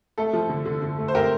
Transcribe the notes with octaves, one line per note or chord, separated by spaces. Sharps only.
A3 A4
F3
D3
D3
D3
A3
C5
A3 G4 A#4